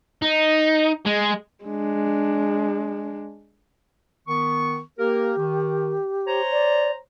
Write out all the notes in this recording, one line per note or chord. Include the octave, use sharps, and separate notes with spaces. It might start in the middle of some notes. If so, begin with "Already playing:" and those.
D#4
G#3
G#3 D4
D#3 B3 C#6
A#3 G4 A#4
D#3
C5 C#5 A#5
D5